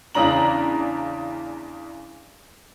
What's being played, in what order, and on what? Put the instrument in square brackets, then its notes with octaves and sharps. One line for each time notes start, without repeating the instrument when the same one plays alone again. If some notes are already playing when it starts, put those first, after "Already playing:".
[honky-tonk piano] E2 C#3 D4 A#5 F#7